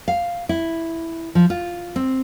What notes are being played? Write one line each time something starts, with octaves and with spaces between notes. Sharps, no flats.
F5
E4
F3
F4
C4